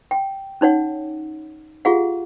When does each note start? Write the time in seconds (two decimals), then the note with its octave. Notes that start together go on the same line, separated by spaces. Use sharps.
0.11 G5
0.61 C#4 D#4 C#5 F#5
1.85 F4 G4 G#4 F5 F#5